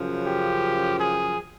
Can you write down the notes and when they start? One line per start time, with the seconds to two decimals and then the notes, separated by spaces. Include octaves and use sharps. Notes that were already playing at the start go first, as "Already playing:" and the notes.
Already playing: F#2 C#3 F3
0.27 G4
0.99 G#4